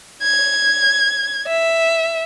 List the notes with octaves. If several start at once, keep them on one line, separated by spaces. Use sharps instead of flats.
G#6
E5